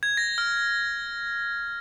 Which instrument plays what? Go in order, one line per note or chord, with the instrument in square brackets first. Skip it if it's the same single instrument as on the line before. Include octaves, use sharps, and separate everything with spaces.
[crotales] G#6
A#6
F6